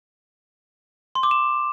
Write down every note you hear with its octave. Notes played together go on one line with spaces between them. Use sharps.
C6
D6
E7